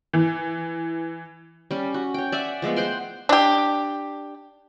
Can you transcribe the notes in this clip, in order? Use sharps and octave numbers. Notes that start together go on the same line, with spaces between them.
E3
G3 C#4
F#4
C#5 G5
D5 E5 F#5 G#5
F3 G#3 A3 B3
C5 F#5 G5 C6
D4 G4